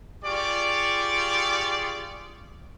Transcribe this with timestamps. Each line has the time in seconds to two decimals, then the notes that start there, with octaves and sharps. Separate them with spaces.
0.24 F4 G4 G#4 D5 C#6 D6